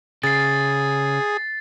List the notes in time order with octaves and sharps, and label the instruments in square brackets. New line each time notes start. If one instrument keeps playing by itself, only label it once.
[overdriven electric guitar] C#3 [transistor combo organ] G#4 [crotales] A6 C7